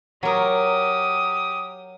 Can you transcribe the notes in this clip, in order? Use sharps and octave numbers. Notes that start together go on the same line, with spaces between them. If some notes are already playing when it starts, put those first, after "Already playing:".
F#3 G4 A#4 D#6